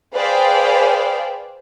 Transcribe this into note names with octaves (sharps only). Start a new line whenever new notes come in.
G#4 B4 C5 D5 F5 G5